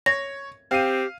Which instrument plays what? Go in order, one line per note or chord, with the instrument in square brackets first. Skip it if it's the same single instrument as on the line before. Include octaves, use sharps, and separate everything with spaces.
[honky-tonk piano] C#5 [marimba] A#6
[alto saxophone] C4 [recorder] G4 [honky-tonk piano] F5 D#7